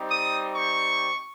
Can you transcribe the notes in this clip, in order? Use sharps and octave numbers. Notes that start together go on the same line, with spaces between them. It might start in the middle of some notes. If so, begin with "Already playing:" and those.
Already playing: G3 C4 D#4 G4
D#6
C#6